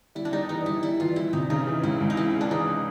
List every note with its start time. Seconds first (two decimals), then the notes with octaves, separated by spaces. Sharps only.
0.15 G3 E4
0.25 D4
0.32 G3 D#4
0.49 E3 D#4
0.66 G3 E4
0.82 G3 E4
1.00 E3 F4
1.16 G3 E4
1.33 C3 D#4
1.50 C#3 D#4
1.67 E3
1.83 C#2 E4
2.01 C#2
2.10 D#4
2.17 E3 E4
2.34 G#3
2.41 D4
2.51 E3 D#4